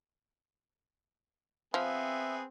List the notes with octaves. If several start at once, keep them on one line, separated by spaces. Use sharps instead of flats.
F3 B3 C4 G#4 E5